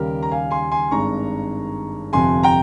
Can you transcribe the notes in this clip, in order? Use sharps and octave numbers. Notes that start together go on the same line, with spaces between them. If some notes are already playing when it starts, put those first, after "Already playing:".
Already playing: D#2 C#3 G3 G4 A#4
A#5
F5 G#5
G#5 C6
G#5 C6
G#1 G2 D#3 G#3 A#5 C#6
G1 F2 C3 G#5 C6
G5 A#5